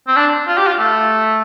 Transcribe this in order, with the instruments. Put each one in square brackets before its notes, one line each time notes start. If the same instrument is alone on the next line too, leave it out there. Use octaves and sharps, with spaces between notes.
[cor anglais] C4
D4
F4
G4
F4
A3